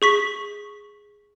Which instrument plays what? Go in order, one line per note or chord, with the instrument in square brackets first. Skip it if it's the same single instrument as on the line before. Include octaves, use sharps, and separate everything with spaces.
[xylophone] G#4 C#6 B6